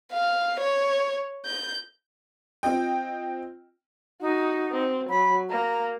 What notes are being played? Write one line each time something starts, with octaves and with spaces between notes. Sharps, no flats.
F5
C#5
G6
C4 F4 D#5 G5
D#4 F#4
C4
F#3 B5
A#3 A#5